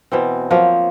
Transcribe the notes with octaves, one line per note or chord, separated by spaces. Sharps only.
B2 E3 C4
F3 F#3 A#3